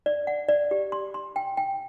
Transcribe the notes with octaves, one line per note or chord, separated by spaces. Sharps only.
D5
F#5
D5
G4
C6
C6
G5
G5